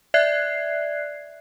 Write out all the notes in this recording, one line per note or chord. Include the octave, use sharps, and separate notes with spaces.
D5 E5 F#6 G#6 C7